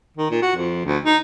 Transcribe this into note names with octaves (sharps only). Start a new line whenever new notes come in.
D#3
A#2
F#4
F2
D2
D#4